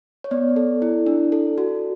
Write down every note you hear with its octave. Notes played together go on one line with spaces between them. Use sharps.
C#5
B3 D5
A4
E4
D4
A4
F#4